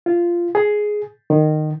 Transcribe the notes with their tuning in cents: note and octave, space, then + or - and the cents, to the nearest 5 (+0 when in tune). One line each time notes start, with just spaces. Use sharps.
F4 -15
G#4 +10
D#3 -20